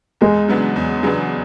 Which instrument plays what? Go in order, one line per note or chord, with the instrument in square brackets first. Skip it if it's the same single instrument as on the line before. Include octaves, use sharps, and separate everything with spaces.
[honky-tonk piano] E2 [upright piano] G#3
[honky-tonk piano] C#3 F#3 B3 D4
E2
C#3 F#3 B3 D4